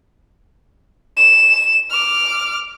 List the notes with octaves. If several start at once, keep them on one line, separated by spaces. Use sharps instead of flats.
E7
D6 F6